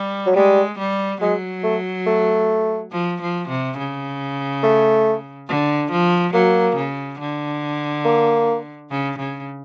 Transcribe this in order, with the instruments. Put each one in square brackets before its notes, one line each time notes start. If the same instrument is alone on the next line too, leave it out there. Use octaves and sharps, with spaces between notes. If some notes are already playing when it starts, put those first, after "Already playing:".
Already playing: [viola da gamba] G3
[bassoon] F#3
[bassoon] G3 [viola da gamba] G#3
[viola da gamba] G3
[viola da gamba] F#3 [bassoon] G#3
[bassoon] A3
A3
[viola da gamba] F3
F3
C3
C#3
[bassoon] A3
[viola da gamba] D3
F3
[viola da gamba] F#3 [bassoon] A#3
[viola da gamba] C#3
D3
[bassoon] A#3
[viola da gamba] C#3
C#3